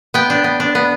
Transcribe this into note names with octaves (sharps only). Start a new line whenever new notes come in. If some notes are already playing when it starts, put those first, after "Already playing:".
B3 G5
D4
B3
D4
B3